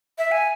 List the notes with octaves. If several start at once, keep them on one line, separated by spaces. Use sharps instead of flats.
E5
G#5